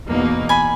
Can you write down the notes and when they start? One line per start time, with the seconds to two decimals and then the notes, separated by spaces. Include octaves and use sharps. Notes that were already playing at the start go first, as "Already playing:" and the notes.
0.08 E2 B2 A#3 D#4
0.49 G#5 B5